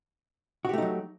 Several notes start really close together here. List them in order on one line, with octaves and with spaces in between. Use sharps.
F#4 G4 A3 D#4 F#3